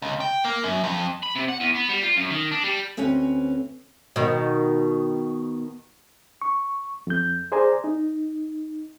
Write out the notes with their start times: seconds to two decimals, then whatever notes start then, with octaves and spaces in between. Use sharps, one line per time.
0.02 C#2
0.20 G5
0.45 A#3
0.64 F#2
0.84 F2
1.23 B5
1.36 C3
1.49 F#5
1.60 E2
1.75 B3
1.89 G3
2.03 F4
2.17 F#2
2.30 D#3
2.51 D4
2.63 G3
2.97 D2 C4 C#4 B4 C#5
4.16 B2 D#3
6.42 C#6
7.07 F2 G6
7.52 G#4 C5 D5 G#5 A#5
7.84 D#4